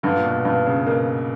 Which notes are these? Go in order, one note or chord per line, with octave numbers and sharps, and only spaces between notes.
G2 D3
A#2
B2
G2 B2
C#3
B2 A#3